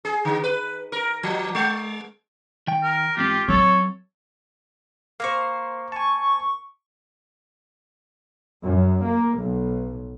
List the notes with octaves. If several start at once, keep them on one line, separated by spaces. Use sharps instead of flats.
G#4
D3
B4
A#4
F3
G#3
D#3 G5
A#4
E2 G#2 C4 F4 G4
F#3 C4 A4 C#5
A#3 A#4 C5 F5 C#6
G#5 A5 C#6
F#2
A#3
B1